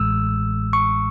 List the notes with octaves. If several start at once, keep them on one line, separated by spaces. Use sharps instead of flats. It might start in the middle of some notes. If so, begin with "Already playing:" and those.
Already playing: A1 A2 E3 G#3 E6
C#6